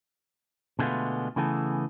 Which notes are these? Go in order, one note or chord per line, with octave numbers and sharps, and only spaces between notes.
B2 D3 G#3 A3 B3 F4
C#3 E3 A3 B3 G#4 A4